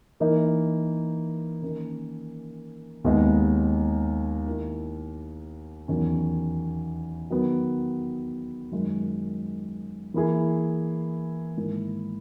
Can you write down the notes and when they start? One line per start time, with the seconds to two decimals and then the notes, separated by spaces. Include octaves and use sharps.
0.20 E3 A#3 D#4 A#4
1.62 D#3 A#3 C#4
3.04 D#2 D#3 G#3 B3 D#4
4.47 D#3 A#3 E4
5.88 E2 D#3 F#3 C#4
7.30 D#3 F#3 B3
8.72 F#2 D#3 G#3
10.14 E3 A#3 E4 G#4
11.57 G#2 D#3 A#3 E4